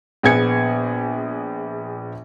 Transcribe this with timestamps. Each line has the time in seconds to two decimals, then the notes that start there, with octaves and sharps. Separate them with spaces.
0.23 A#1 B3 G#4 G#6 C#7